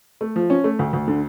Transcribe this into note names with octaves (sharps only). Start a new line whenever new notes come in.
A3
F3
C#4
A3
D2
D2
D3